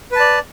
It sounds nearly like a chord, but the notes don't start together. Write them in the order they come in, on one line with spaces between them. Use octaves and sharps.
B4 A5 D5